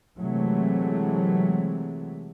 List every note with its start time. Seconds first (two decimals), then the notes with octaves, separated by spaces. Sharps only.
0.18 C3 E3 F#3 G#3 A3